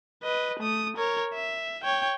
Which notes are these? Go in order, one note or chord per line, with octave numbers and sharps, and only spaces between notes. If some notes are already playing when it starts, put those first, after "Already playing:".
B4 D#5
A3 D#6
A#4 C#5
E5
C#5 G5